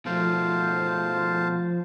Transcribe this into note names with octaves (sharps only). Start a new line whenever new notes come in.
B2 F3 A3 C5 F5 A5